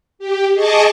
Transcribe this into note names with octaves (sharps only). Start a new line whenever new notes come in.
G4
G#4 D#5 A5 C#6 D6